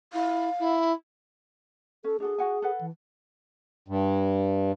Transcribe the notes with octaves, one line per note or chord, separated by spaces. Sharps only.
E4 F5
E4
C#4 A4
D4 F#4 G#4 A4
F#4 F#5 G#5
A4 B4 F#5
E3
G2